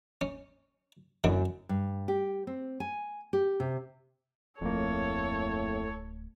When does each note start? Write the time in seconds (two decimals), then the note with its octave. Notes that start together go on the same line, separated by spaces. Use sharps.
0.21 C#4
1.24 F#2 B2 D3 E3
1.69 G2
2.08 G4
2.47 C4
2.80 G#5
3.33 G4
3.60 C3
4.61 D1 F2 A2 A3 A#3 A4 C#5